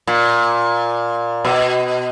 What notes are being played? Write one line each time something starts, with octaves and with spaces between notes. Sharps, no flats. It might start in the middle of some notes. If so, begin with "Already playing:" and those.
A#2
B2